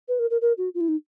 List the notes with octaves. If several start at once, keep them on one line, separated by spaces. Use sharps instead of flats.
B4
A#4
A#4
A#4
F#4
F4
E4
D#4